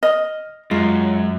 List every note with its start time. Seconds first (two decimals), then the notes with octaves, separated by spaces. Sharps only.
0.03 D#5 F6
0.71 F#2 G#3 F4